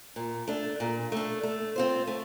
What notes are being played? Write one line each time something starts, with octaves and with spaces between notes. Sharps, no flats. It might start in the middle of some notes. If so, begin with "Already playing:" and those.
A#2
A3 D4
A#2
A3 D4
A3
C4 F4 C5
A3